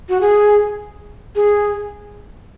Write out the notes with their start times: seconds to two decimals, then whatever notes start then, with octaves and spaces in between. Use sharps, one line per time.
0.09 F#4
0.21 G#4
1.36 G#4